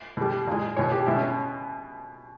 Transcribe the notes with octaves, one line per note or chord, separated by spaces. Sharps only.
B2 G3
A#2 G#3
B2 G#3 C#5
G4
B2 G#3 E4
C#4